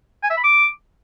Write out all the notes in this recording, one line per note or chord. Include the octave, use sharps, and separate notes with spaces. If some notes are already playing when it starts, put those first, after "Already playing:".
G#5
E5
B5
D6